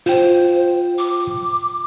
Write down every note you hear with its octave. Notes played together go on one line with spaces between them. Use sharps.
F4 C5 G5
D6